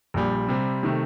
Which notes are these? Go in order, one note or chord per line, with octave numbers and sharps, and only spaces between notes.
A#1 A#2 G3
C3 G3 C4
C3 D#3 A3